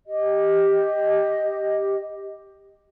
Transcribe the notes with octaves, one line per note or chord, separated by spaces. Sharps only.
G4 D#5